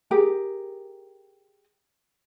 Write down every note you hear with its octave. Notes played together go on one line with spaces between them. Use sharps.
G4 G#4 A#4 A#5